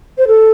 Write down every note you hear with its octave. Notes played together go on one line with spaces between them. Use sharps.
C5
A4